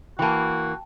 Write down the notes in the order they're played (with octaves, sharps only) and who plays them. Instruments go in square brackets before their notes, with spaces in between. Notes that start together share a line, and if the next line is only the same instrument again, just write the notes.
[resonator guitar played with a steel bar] E3 A#3 [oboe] F#4 [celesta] G5 A5